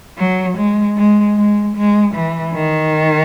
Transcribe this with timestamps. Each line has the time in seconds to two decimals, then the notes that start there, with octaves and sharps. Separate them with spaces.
0.18 F#3
0.57 G#3
0.97 G#3
1.37 G#3
1.76 G#3
2.15 E3
2.54 D#3